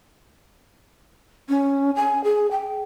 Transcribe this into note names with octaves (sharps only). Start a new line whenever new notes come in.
C#4
G#5
G#4
G5